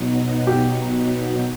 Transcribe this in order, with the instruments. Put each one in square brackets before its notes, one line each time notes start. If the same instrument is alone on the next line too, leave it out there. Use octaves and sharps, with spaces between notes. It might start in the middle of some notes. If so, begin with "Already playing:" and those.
Already playing: [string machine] B2 F#3 B3 D#4
[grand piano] G4